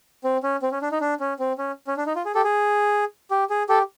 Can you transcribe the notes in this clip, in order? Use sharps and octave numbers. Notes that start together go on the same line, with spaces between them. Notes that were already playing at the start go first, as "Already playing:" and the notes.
C4
C#4
C4
C#4
D4
D#4
D4
C#4
C4
C#4
C#4
D4
D#4
F4
G#4
G4 A4
G#4
G4
G#4
G4 A4